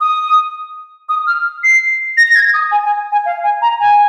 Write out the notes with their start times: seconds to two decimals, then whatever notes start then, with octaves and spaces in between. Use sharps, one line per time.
0.01 D#6
1.09 D#6
1.27 F6
1.64 C7
2.17 A#6
2.28 A#6
2.36 G#6
2.54 D#6
2.72 G#5
2.85 G#5
3.12 G#5
3.25 F5
3.44 G#5
3.62 A#5
3.80 G#5